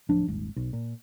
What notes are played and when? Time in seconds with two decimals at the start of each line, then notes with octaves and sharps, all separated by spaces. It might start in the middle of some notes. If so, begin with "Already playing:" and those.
0.09 D1 F3 D4
0.27 D#1 G#1
0.56 B1
0.73 A#2